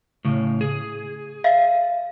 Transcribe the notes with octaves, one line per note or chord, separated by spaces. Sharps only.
A2 C#3
G#4
E5 F5